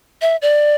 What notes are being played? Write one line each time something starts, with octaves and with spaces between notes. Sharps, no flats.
E5
D5